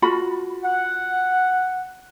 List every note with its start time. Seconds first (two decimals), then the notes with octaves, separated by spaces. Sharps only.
0.02 F4 F#4 B5
0.64 F#5